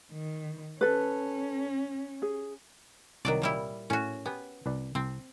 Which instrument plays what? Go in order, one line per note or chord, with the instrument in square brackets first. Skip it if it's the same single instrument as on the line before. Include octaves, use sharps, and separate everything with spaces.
[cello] D#3
[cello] C#4 [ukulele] A4 B4
[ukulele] G#4
[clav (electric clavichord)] C2 [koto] D#3 F#3 D5
[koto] A#2 G3 E4
[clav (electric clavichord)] A2 [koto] C#4 F#4
[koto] B3 [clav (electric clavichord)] G4 G#5
[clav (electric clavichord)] C2 B4 D5
[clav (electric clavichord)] C2 [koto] C4